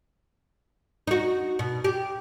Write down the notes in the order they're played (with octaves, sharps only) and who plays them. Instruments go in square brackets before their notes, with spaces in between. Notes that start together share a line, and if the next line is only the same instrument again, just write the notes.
[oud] D#4 F#4
B2
G4